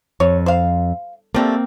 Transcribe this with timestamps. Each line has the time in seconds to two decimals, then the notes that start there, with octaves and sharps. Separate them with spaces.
0.20 F2 C#5
0.46 C5 F5
1.34 D3 G3 A3 A#3 C4